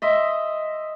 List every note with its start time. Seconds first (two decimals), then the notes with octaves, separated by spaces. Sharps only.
0.02 D#5 E5 C6